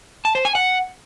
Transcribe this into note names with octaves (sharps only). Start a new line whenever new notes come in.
A5
C5
G#5
F#5